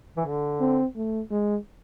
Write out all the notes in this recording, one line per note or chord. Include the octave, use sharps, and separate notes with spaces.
E3
D3
C4
A3
G#3